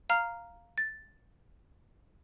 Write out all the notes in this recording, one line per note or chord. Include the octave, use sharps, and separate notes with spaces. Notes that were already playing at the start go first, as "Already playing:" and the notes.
F5 A#5 F6
A6